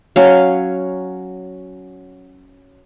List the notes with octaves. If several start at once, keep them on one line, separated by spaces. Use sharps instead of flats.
F#3 C#4 F5